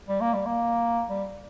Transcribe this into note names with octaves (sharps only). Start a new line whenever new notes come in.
G3
A#3
G3
A#3
G3